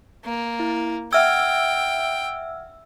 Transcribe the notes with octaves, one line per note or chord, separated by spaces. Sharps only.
A#3
E4
E5 F#5 G5 E6 F6 G#6